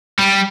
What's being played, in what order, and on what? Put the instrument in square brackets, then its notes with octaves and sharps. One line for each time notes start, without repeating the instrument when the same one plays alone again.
[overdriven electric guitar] G3